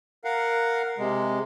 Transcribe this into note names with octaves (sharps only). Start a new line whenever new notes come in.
A#4 F5 F#5
C3 G#3